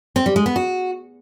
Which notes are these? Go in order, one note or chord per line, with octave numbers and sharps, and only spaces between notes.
C4
G3
G#3
B3
F#4